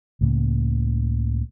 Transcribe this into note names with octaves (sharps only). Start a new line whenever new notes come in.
C#2 A2 C#3 A#3